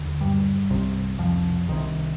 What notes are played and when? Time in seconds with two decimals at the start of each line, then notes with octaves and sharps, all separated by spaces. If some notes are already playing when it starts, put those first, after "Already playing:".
Already playing: D#2 D3
0.21 G2 G3
0.70 C2 C3
1.18 F2 F3
1.68 C2 C3 D#3